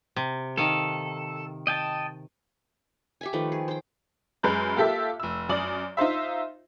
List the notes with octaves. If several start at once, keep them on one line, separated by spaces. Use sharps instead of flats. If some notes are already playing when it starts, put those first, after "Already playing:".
C3
D#3 A4 F5
D#5 G5 A5
G4 E5 G#5
D#3 F3 A3 B4
G#4
C5 G5
F#2 G#3 B4 A#5 F#6 G6
A#3 F4 G4 A4 E5
F1 E6
F#2 D5 D#6 F#7
D#4 F4 C5 E5